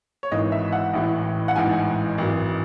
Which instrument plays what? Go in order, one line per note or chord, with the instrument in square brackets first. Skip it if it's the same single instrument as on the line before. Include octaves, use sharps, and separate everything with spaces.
[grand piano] C#5
G#1 G#2 E3 D#5
E5
F#5
A1 A2 E3
F#5
A1 G#2 E3 G#5
G#1 F#2 E3